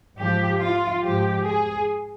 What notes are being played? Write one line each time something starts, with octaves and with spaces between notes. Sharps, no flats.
G#2 F3 G4
F4
G#2 F3 G4
G#4